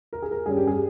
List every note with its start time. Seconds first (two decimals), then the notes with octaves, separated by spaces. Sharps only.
0.13 A#4
0.22 G#4
0.31 A#4
0.46 G2 G3 C#4 G#4
0.57 G4
0.67 G#4